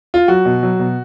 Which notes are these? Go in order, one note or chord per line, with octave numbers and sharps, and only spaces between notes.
F4
F#3 F#4
B2
F#3
B2